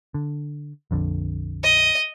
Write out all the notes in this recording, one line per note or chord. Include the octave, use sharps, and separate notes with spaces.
D3
A#1 F2 D3
D#5